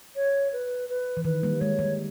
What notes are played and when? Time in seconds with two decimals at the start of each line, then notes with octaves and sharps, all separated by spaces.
0.16 C#5
0.53 B4
0.89 B4
1.17 E3
1.24 D#3 B4
1.43 G3 A#3
1.61 G#3 C#5
1.79 G3